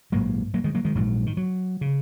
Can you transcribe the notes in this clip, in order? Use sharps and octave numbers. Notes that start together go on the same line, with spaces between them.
A#1 G#2 F#3 A#3
F#3 A#3
D#3 G#3
F#3 A#3
D#3 G#3
A#1 G#2 F#3
D#3
F#3
C#3